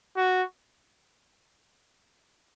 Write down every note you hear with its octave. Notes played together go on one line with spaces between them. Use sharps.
F#4